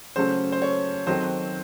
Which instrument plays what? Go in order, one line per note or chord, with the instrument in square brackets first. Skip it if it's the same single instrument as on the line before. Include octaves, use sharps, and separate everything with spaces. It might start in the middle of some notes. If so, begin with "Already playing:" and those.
[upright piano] C#3 F#3 A3 C#4 A4 [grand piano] C5
[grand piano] C5
C#5
[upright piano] D#3 F#3 C4 F#4 A4 [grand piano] C5